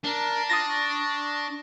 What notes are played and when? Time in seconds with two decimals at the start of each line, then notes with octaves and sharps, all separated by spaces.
0.04 D4 A#4
0.50 F4 D#6 A6 A#6
0.67 C#6